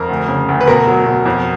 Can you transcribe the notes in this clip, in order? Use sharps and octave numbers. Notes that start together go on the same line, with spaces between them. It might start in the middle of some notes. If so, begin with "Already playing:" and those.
Already playing: F2 A#4
D2
C#3
D2
B4
B2 A#4
F#3
B2
F2